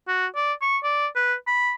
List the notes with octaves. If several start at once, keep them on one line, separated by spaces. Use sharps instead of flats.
F#4
D5
C#6
D5
B4
B5